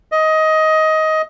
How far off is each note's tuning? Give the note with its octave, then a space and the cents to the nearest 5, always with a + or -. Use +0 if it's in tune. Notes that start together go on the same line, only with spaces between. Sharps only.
D#5 +15